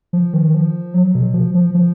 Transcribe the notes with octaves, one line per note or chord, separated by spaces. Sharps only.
F3
D#3
F3
F#3
B2
F3
F3
F3